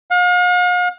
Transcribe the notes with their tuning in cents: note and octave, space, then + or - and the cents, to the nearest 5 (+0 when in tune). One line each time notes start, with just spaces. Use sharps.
F5 +45